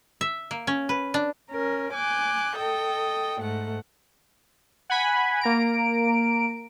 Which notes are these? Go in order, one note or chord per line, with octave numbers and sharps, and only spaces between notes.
E5
A#3
C#4
B4
D4
C#4 A#4
G#5 D6 F#6 G6
A4 D#5 G5
G#2 A3 F#5
F#5 G#5 B5
A#3 A#5 D7